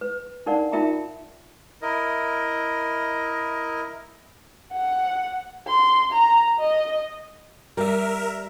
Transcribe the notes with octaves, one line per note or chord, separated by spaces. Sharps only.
B4
D4 D#4 A#4 D5 F5 F#5
D#4 F4 A#4 E5 G5 A#5
E4 A#4 D#5
F#5
C6
A#5
D#5
G3 A#4 E5